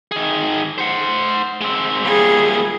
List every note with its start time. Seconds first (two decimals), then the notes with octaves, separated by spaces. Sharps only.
0.12 D#3 G#4
0.78 C5 F#5
1.61 G#3 C4
2.05 A#2 G3 G#4